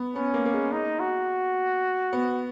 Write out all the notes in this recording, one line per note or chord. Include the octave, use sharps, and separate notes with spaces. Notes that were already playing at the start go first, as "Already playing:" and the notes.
Already playing: B3
B3 C#4
A#3
A#3
G#3
G#3 D#4
F#4
B3